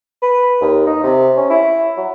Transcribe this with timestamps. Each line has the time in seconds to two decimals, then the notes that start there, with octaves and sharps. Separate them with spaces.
0.22 B4
0.61 D#2
0.87 D#4
1.03 C3
1.37 C#4
1.50 E4
1.97 F#3